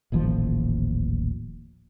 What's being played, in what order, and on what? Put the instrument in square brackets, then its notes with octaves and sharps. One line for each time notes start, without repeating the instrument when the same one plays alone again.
[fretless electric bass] D#1 A1 D#2 F3